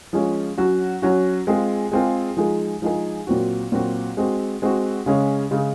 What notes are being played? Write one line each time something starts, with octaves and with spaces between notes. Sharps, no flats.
F3 G#3 C#4
F#3 C#4 F#4
F#3 C#4 F#4
G#3 C4 F4 G#4
G#3 C4 F4 G#4
F3 G#3 D#4 G#4
F3 G#3 D#4 G#4
A#2 F#3 C4 F#4
A#2 F#3 C4 F#4
G#3 C4 F#4
G#3 C4 F#4
C#3 G#3 C#4
C#3 G#3 C#4